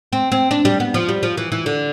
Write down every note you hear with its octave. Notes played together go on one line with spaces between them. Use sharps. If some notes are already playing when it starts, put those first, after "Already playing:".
C4
C4
D4
G3
B3
F3
G3
F3
E3
E3
D3